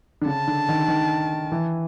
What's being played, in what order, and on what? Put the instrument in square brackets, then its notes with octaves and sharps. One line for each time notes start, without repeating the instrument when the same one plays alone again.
[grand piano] D3
[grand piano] C#3 [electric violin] A5
[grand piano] D3
D#3
D#3
E3